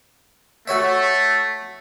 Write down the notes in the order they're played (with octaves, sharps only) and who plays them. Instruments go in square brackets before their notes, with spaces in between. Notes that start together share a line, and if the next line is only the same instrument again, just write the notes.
[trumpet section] A3 [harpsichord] F#4 C#5 E5